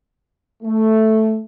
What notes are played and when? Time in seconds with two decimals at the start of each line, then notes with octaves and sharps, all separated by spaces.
0.63 A3